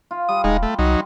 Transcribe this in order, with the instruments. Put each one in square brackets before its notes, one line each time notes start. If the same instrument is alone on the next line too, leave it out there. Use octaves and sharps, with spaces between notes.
[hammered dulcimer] F4
[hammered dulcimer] G3 [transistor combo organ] D#6
[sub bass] D#1 [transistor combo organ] G#3 D#4
[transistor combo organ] A3
[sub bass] C2 [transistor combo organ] F#3 D#4